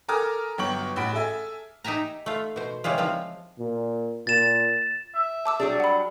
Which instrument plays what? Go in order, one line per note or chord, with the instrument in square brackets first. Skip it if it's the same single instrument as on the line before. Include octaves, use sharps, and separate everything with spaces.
[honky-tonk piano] A4 A#4 G#5 D6 D#6 F6
G1 F#3 B3 G5 C#6 F#7
A1 F#4 B5 D7
G#4 A4 E5 G#5
[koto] D#4 G4 E5 G#5 A#5
A3 F4
B2 C5
C#3 E3 G3 G#3 F4
F3 C4 F4
[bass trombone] A#2
[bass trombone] A#2 [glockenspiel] A6 E7
[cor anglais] E5
[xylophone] A5 D6 E6
[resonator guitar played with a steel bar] F#3 G3 D4 [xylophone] G#4
[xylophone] F#5 B5